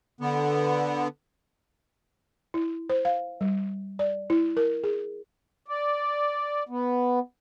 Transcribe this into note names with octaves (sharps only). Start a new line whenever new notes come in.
D3 B3
E4
C5
F5
G3
D5
E4
A#4
G#4
D5
B3